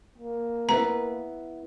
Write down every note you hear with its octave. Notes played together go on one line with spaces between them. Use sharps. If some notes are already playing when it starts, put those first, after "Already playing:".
A#3
B3 E4 B4 A#5